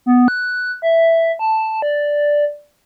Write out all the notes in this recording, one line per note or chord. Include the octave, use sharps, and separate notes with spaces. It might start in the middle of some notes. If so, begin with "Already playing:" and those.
B3
F#6
E5
A5
D5